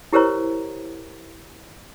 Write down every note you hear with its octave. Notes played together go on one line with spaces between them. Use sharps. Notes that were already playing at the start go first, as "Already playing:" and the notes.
E4 G4 A#4 C5 C#5 A#5